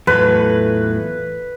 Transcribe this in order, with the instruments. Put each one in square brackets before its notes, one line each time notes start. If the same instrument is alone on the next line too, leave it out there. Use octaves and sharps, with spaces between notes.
[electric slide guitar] E2 A2 F#3 [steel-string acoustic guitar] A3 F4 A4 [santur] B4